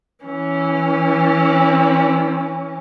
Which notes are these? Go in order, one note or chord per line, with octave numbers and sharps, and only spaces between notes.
E3 C#4